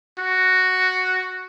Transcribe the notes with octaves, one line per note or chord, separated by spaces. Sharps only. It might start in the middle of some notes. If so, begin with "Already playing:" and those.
F#4